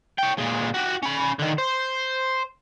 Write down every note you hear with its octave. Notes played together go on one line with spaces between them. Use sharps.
C#5 G5
A#2 G#3
F#4 G4
C#4 B5
D3 D#3
C5